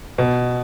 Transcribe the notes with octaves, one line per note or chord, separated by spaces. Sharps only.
B2